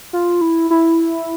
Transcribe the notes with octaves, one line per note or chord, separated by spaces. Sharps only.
F4
E4
E4